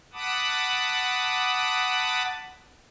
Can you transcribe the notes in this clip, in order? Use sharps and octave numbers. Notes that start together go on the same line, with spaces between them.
F#5 A5 B5 D6 D#6